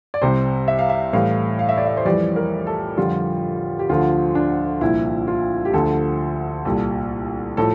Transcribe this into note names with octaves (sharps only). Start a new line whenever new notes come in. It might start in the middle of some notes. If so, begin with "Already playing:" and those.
D5
C2 C3 G3 C5
E5
F5
E5
A2 E3 G3 F5
F5
E5
D5
E5
C5
F2 E3 G3 D5
A#4
A4
F2 D3 G3 F4
G4
D2 D3 F3 F4
D4
C2 A#2 F3 E4
F4
G4
D2 D3 F3 A4
C2 A#2 G3 A4
A2 F3 A4